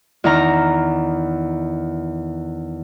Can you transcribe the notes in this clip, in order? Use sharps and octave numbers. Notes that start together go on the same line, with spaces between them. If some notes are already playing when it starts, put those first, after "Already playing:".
E2 D#3 A#5